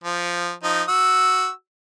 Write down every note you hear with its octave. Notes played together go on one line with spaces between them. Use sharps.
F3
F3 D#4
F#4 E6